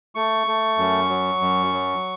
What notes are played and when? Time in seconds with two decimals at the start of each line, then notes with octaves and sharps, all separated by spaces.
0.15 A3 C#6
0.47 A3
0.78 F#2
1.09 F#3
1.41 F#2
1.73 F#3